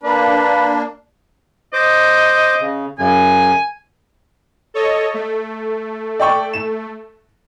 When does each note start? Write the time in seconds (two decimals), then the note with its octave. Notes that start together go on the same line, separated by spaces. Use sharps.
0.03 A#3 D4 B4
1.73 C5 D#5 D6
2.61 C#3
2.99 F#2 C#3 G#5
4.74 A4 C#5 D#5
5.14 A3
6.19 D5 G5 C#6
6.54 E7